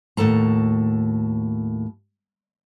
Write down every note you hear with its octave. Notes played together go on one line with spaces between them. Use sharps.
D#2 A2 F#4 A4 A#5